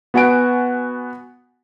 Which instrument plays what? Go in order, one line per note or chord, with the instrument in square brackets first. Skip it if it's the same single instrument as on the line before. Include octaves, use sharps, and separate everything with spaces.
[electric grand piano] B3 F#4 F#5 G#5 D7